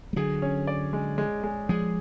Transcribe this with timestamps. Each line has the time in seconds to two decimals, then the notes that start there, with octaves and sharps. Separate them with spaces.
0.13 G#3
0.16 D3 F#3 G#4
0.42 C#4
0.67 D5
0.93 G#3
1.18 G#3
1.44 G#3
1.69 F3 G#3 G#4